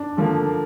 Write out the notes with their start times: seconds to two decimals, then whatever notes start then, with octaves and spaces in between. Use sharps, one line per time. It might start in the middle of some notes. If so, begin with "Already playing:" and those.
Already playing: D4
0.17 D3 F3 A#3